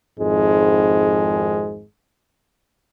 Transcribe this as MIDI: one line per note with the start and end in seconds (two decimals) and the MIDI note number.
0.18 1.84 32
0.18 1.84 41
0.18 1.84 44
0.18 1.84 56